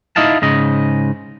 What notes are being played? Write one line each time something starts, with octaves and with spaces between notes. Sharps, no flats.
D#4 E4 D#5 F5 A5
G#2 C#3 D#5